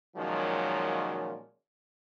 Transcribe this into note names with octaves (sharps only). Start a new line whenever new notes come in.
A#2 D#3 F3 F#3 G#3 C#4